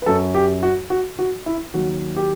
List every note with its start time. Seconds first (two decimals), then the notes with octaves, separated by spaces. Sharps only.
0.02 B4
0.06 F#2 F#3 A4
0.35 G4
0.63 F#4
0.90 F#4
1.19 F#4
1.46 E4
1.74 D#2 D#3 F#3 F#4
2.16 G4